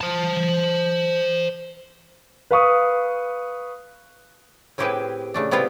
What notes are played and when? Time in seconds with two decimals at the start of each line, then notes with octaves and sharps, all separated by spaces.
0.01 C5 A5
2.51 B4 F5 C#6 D#6
4.78 A2 C4 E4 G4 G#4 B4
5.34 C#3 A3 D4
5.51 C3 B3 C4 E4 F4